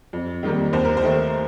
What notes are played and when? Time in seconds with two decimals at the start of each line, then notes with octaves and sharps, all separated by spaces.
0.13 F2
0.43 D#3 G3 A#3
0.73 D#2 C5
0.85 A#4
0.97 C5
1.02 D#3 A3